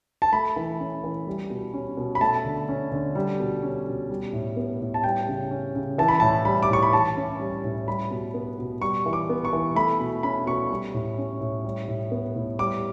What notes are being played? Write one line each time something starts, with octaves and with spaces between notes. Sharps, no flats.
A5
A3 B5
E3
C#4
E3
G3
B2
C#4
B2
B5
A3 A5
D3
C#4
D3
G3
B2
C#4
B2
G3
A2
B3
A2
A5
G3 G5
C#3
C#4
C#3
E3 A5
B5
A2 A5
G3 B5
D6
A2 C#6
B5
E3 A5
C#4
G3
A2
G3 B5
B2
B3
B2
G3 C#6
E3
D6
B3
C#6
E3
A3 B5
B2
C#4 B5
B2 C#6
G3
A2
C#4
A2
G3
A2
B3
A2
G3 D6